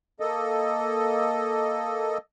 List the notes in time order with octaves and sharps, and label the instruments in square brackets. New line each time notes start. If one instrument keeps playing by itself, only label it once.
[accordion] A#3 A4 D#5